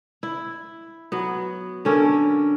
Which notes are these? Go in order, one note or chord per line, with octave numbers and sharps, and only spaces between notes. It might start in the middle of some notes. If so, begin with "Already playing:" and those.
E4
F#3 B3
D3 C#4 A4 A#4